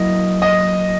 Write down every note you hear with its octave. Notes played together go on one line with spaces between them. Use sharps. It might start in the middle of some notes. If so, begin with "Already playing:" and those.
Already playing: F#3 A#3 E4 D#5
D#5